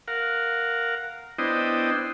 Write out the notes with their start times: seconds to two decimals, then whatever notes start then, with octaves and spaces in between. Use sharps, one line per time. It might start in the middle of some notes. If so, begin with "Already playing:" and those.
0.08 A#4 F5 F#5
1.39 B3 D4 E4 C5 D#5 G5